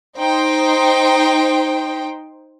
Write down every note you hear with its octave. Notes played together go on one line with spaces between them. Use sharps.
D#4 C5 G5